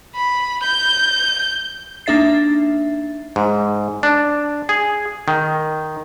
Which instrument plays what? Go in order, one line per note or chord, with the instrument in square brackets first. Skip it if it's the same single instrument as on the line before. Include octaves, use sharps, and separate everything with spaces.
[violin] B5
G6
[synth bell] A#3 D4 D#4 E5 A6 C7
[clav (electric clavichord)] G#2
D4
G#4
D#3